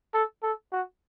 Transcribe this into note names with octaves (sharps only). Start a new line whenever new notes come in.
A4
A4
F#4